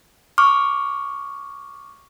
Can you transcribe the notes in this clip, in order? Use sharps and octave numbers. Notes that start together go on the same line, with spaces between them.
C#6 D6 F6